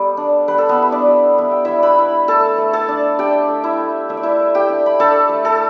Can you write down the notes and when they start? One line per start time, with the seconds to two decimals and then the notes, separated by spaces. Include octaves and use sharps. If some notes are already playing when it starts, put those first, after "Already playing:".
Already playing: G3 B3 A4 B4
0.17 D4
0.48 G3 B4
0.58 A4
0.69 B3 B4
0.78 E4 E5
0.92 D4 D5
1.07 G3
1.38 B3 E5
1.52 G5
1.65 G3 E4 E5
1.83 B4 B5
1.98 E4
2.28 A3 A4 A5
2.58 A3
2.73 A4 A5
2.89 D4
3.19 D4 G4 G5
3.48 A3
3.63 E4 E5
3.79 A3
4.09 A3 E5
4.17 D5
4.23 E4 E5
4.39 A3
4.55 G4 G5
4.69 D4
4.86 B5
4.99 D4 A4 A5
5.29 A3
5.45 A4 A5